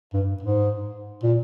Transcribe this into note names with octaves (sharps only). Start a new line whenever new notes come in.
G2
G#2
A#2